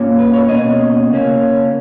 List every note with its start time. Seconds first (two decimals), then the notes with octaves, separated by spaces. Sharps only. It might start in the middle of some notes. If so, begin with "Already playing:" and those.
Already playing: A#2 A#3 C#4
0.19 B4
0.33 C#5
0.49 B2 A#3 C#4 D#5
1.12 C#3 A#3 C#4